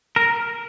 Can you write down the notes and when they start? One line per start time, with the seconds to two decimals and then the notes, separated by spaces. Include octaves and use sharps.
0.16 A#4